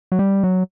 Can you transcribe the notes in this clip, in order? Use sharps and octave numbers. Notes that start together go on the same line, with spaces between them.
F#3
G3
F#3